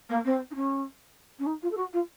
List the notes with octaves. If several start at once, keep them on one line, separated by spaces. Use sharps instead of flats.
A#3
C4
D#4
C#4
C#4
D#4
F4
A4
F#4
F4